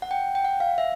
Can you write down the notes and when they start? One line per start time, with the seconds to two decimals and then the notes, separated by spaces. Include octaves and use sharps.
0.02 F#5
0.11 G5
0.35 G5
0.45 F#5
0.60 F5
0.78 E5